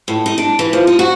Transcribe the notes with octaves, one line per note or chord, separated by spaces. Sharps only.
A2
D#4
D4
E3
F3
D#4
F#4